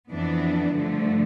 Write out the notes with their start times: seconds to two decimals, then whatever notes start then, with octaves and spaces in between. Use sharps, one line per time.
0.09 F2 E3 B3 D4
0.73 G2 D3 F3 A3